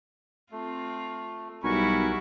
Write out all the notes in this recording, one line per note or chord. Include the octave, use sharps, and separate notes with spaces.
A3 C4 F4
B1 G3 E4 F#4 A#4 G#5 B5 C#6